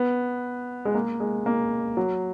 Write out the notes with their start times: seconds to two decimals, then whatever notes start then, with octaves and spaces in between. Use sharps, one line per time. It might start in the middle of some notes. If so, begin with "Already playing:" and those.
Already playing: B3
0.85 G#3
0.95 A#3
1.20 G#3
1.46 A#3
1.97 F#3